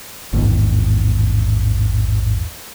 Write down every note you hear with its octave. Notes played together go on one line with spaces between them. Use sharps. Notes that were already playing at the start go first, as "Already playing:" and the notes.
A1 E2 G#2 D#3